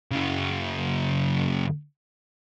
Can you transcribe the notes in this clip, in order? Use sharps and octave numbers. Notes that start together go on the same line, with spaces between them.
F#2 C#3